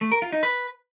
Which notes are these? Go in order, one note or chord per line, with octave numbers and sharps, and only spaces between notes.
A3
A#4
F4
D#4
B4